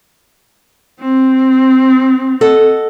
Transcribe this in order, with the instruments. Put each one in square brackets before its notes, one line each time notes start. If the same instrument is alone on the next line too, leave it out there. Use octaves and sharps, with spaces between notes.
[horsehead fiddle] C4
[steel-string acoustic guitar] A4 D#5 F#5